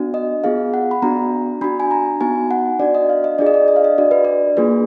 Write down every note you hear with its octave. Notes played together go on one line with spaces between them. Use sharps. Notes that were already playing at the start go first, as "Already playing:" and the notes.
Already playing: B3 D4 F#4
D#5
B3 F4 G#4 F5
F#5
B5
B3 D4 F#4 A#5
D4 F#4 B5
G#5
A#5
B3 D#4 F#4 G#5
F#5
D4 F#4 D5
D#5
F5
D#5
D4 F4 G#4 D5
D#5
D5
D#5
F5
D#5
D4 F#4 D5
B4
D5
A#3 D4 F4 G#4 B4